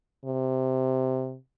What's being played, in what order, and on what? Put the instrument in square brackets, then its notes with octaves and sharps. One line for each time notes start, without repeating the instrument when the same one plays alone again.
[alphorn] C3